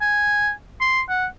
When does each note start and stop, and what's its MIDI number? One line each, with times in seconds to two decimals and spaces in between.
0.01 0.51 80
0.81 1.01 84
1.09 1.26 78